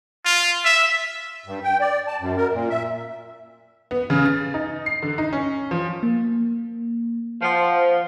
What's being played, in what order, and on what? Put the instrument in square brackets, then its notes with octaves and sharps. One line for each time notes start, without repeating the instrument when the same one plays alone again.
[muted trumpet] F4
E5
[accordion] G2
G5
D5
A5
F#2
A#4
A#2
E5
[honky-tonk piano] B3
C#3
A6
D#4
C7
D3
D#4
C#4
F3
[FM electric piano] A#3
[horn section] F3 [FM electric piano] C5 F#5 C6